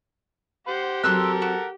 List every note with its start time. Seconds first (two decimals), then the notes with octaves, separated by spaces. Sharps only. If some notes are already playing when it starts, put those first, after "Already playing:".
0.67 G4 C5 F#5
1.03 F#3 C4 A4 A#4 C6 E6 F#6
1.42 F#4